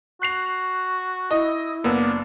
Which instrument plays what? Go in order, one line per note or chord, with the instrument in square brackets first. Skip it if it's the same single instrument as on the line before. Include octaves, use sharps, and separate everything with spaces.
[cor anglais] F#4 [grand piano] F#6 C7 F7
[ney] E4 [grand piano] D#5
[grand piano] F#1 E6 [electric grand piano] A#3 B3 [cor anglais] D4